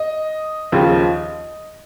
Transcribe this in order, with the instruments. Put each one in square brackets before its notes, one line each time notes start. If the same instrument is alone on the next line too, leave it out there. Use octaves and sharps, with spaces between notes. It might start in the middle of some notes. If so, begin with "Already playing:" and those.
Already playing: [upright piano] D#5
D#2 C#3 F3